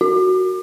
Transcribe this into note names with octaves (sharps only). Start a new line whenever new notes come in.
F#4